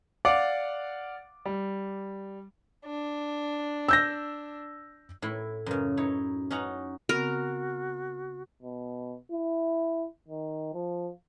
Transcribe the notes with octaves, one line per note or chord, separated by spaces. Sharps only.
D5 F5 F#5 D6
G3
D4
E6 G6 A#6
A2 E4
F#2 C#3
D#4 E4 C#5
C#4 D#4 F#5 A#5
C#3 B3 C4 F#4 A#4
B2
E4
D#3
F3